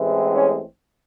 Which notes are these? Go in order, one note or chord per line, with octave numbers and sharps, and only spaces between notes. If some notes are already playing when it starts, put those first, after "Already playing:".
Already playing: A1 A2 E3 G#3 C4
C#4